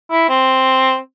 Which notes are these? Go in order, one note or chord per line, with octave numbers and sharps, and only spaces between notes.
E4
C4